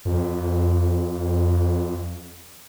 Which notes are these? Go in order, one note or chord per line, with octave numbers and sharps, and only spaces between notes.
F2